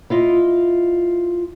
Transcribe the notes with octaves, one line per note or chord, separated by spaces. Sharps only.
E4 F4 D#5